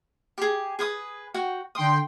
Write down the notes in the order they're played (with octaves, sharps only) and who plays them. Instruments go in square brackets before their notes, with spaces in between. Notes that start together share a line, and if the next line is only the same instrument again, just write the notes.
[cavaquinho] G4 G#4
G#4 B4 D#6
F#4 F#5 G5
[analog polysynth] D3 G5 C6 [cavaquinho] D#6